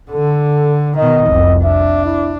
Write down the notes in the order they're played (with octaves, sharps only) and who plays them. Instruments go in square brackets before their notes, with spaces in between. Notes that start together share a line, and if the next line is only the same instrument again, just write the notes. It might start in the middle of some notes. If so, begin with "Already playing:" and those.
[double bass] D3 [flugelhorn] A4
[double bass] B2 D#3 [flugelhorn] D#5
[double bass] F1 C2
[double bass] D4 [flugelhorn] E5
[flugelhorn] E4